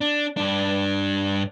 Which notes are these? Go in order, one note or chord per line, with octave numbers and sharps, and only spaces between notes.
D4
G2 D4